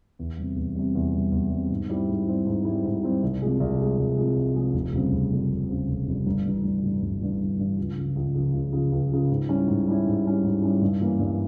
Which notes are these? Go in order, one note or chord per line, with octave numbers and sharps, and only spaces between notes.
E2
C3 G3
E2
C3 G3
E2
C3 G3
E2
C3 G3
G#2
G3 C4 E4
G#2
G3 C4 E4
G#2
G3 C4 E4
G#2
G3 C4 E4
C2
C3 F3 G#3
C2
C3 F3 G#3
C2
C3 F3 G#3
C2
C3 F3 G#3
F1
F2 C#3 G3 C4
F1
F2 C#3 G3 C4
F1
F2 C#3 G3 C4
F1
F2 C#3 G3 C4
G1
G2 E3
G1
G2 E3
G1
G2 E3
G1
G2 E3
C#2
C#3 F3
C#2
C#3 F3
C#2
C#3 F3
C#2
C#3 F3
G#2
G3 C#4 E4
G#2
G3 C#4 E4
G#2
G3 C#4 E4
G#2
G3 C#4 E4
G2
E3 A#3 C#4
G2